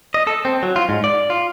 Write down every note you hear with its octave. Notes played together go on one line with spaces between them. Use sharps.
D#5
A4
C4
F#3
F4
G#2
D5
F4